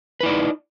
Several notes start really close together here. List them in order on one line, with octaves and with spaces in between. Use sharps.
B4 E4 D5 D#4